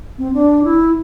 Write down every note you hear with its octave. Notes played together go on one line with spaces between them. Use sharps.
C4
D4
E4